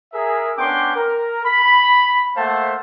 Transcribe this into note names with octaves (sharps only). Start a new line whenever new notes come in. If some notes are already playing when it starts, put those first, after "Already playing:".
G#4 A#4 E5
B3 C#4 D4 G5 C6 D6
A#4
B5
A3 A#3 C5 F5 F#5 A5